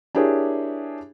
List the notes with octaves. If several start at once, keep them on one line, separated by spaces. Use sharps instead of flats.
D4 E4 G4 G#4 A#4 C#5